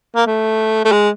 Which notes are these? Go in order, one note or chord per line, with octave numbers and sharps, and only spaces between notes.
A#3
A3
A3
G#3